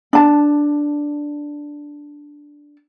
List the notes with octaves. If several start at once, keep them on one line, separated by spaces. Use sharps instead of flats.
D4 A5